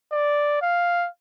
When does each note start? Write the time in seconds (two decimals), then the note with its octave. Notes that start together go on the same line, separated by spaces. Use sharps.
0.12 D5
0.62 F5